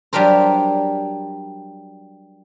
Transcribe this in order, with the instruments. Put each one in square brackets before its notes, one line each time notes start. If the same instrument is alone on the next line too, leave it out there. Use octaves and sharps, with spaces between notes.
[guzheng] F#3 G3 D4 F4 A#4 C5